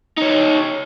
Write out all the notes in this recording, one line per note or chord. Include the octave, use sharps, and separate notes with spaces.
D#4 C#5